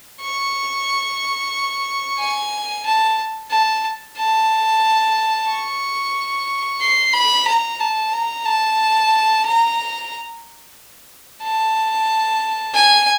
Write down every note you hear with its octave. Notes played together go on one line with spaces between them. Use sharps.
C#6
G#5
A5
A5
A5
C#6
C6
B5
A#5
A5
A#5
A5
A#5
A5
G#5